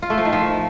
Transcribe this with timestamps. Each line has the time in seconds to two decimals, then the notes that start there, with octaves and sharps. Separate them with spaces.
0.02 F4
0.10 A3
0.18 F3
0.25 D#3
0.33 F3